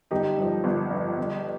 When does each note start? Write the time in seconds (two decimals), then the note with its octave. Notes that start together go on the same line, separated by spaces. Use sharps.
0.11 G1 D#4 G4
0.37 G2 F3
0.64 G1
0.91 G2 F3
1.18 G1